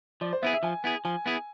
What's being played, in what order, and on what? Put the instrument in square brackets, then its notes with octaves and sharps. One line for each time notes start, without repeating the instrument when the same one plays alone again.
[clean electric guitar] F3 [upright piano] D5
[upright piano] C5
[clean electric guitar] B3 E4 G#4 [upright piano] E5
[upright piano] E5
[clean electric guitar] F3 [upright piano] G#5
[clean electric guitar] B3 E4 G#4
[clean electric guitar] F3 [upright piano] G#5
[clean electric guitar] B3 E4 G#4